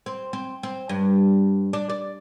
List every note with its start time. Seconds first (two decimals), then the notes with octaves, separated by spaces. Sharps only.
0.06 C4
0.33 C4
0.63 C4
0.89 G2
1.73 D4
1.90 D5